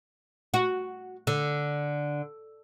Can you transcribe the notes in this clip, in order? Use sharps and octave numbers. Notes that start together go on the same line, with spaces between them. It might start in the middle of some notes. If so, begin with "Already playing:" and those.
F#4
D3